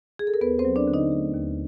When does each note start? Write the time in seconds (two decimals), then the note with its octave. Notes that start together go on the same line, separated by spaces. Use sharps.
0.19 G#4
0.27 A4
0.34 A#4
0.41 D#2 B3 B4
0.59 C4 C5
0.65 F#3
0.76 D4 D5
0.87 D3
0.94 D#4 D#5
1.11 A3
1.34 D#2